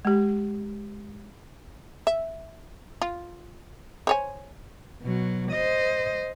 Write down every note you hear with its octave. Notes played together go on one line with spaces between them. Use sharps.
G#3 G4
E5
F4
C5 C#5 G#5
B2 F#3
C5 D#5